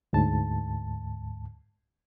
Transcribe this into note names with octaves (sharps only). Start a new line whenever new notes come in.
D2 G#2 A5